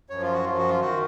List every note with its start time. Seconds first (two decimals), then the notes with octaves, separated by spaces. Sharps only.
0.10 F#2 F3 C#5
0.22 F4
0.33 F#4
0.45 F#2 F3 F4
0.58 F#4
0.68 F4
0.80 D#3 F#4